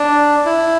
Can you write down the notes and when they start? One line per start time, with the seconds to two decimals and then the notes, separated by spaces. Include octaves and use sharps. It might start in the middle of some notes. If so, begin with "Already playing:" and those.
Already playing: D4
0.46 E4